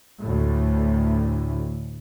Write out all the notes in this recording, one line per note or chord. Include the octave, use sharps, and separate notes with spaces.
D2 A2